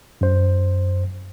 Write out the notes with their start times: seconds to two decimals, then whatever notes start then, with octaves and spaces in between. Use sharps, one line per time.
0.21 F#2 C5